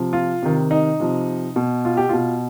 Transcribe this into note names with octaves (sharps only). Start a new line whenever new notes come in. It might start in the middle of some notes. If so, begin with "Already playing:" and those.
Already playing: C3 F3
F4
C3 D#3
D#4
C3 F3
B2
F4
G4
B2 F4